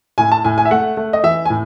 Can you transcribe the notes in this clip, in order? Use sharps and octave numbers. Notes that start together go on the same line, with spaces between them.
A2 G#5
A5
A2 G#5
G#5
E5
A3 F#5
A3
D#5
E3 E5
G#5
A2